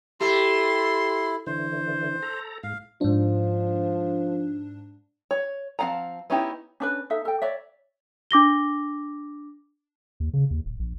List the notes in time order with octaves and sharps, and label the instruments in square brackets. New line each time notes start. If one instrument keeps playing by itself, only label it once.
[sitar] A3 [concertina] E4 [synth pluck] G4 [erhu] C6
[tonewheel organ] D3 E3 [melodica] C5
[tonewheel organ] A4 A#5
[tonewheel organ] G#2 [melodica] F5
[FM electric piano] G#2 D4 [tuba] F3
[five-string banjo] C#5
F3 C4 F5 F#5 A#5
B3 C#4 D#4 E4 G4
[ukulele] C#4 D4 B4
D#4 A4 E5
A4 G5
C#5 D5 E5
[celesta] D4 D6 A#6 G7
[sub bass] D#2
C#3
D#2
D1
A#1